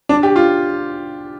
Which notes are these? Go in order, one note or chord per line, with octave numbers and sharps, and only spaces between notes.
D4
G4
F4